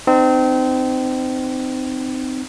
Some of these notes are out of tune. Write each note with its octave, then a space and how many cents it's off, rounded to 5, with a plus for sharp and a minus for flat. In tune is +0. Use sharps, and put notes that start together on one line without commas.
C4 -25 D#4 -35